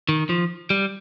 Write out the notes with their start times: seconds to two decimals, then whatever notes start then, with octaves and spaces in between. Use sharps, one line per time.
0.09 D#3
0.29 F3
0.70 G3